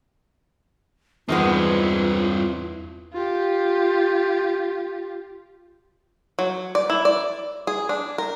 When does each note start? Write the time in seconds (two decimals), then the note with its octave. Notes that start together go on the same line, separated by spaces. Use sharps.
1.28 E2 G2 D#3 G#3 B3 C4 F4 D#6
3.13 F4 G4
6.39 F#3
6.75 D5
6.90 E4
7.05 D5
7.67 G#4
7.89 D4
8.18 A#4